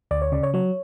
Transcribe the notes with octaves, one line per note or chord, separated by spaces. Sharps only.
D2 D5
C#5
C#3 D5
C#5
F#3 C#5